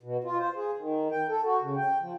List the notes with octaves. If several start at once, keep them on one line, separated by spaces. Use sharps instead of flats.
B2
F4
C5
G#4
D#3
G5
A4
F#4
C#3
G5
F3